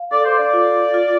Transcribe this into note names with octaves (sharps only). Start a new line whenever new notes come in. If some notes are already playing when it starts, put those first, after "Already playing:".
Already playing: F5
A4 D5
C5
D5
F4
F4